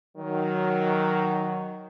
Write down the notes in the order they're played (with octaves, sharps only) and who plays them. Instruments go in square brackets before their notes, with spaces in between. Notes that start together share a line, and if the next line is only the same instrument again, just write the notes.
[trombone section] D#3 F#3